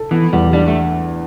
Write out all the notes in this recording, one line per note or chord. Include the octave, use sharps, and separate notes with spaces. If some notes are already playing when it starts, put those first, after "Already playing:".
Already playing: A4
E3 B3
E2 G3
G3 D4
A3